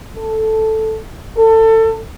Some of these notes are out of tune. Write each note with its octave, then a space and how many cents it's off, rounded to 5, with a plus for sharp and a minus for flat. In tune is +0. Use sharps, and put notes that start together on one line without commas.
A4 +0
A4 +25